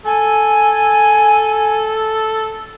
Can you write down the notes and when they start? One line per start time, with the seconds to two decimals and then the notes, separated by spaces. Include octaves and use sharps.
0.05 A4 G#5